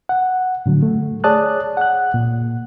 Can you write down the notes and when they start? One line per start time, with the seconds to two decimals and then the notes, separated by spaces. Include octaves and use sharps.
0.09 F#5
0.66 A2 D3 F#3
0.83 A3
1.24 G#4 C#5 D5 A5 D#6 F#6
1.77 F#5 F#6
2.14 A#2